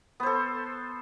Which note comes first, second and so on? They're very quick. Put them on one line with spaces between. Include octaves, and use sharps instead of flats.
B3 C5 A4